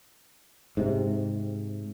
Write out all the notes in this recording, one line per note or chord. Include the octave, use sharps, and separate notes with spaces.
G#2 C3